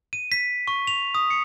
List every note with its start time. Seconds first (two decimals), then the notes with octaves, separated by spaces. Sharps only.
0.13 D#7
0.32 B6
0.67 C#6
0.87 F7
1.15 D#6
1.30 C#7